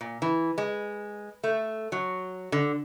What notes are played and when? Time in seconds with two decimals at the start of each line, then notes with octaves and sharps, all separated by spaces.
0.01 A#2
0.22 E3
0.58 G#3
1.44 A3
1.92 F#3
2.52 D3